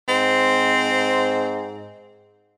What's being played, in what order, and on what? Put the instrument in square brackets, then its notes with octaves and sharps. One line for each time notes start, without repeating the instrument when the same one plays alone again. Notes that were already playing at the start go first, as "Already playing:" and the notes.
[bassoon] G#2 [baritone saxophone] C4